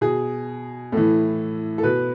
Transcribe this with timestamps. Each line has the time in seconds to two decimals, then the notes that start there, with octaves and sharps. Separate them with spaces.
0.01 B2 G#4
0.92 A2 E3 A4
1.78 A4
1.83 B2 B4